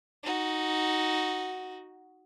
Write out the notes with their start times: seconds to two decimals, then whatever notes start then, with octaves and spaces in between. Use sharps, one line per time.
0.23 D#4 F#4